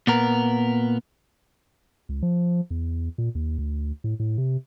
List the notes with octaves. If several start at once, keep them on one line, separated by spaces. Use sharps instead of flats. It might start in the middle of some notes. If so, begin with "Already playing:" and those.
A#2 B3 A#4
C#2
F3
E2
A#2
D#2
D2
A2
A2
C3